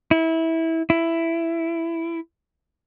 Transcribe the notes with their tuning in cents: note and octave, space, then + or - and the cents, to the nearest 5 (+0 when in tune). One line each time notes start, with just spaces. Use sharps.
E4 -20
E4 +10